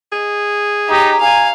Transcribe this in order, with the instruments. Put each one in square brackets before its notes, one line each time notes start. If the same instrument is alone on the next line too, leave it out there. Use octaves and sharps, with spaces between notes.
[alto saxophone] G#4 [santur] D#5
[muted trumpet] D#4 [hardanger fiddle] G4 [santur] A#4 C#5 A#5
[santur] D#4 F#5 [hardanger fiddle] F5 [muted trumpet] G#5